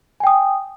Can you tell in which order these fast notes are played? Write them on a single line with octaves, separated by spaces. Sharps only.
G#5 G5 D#6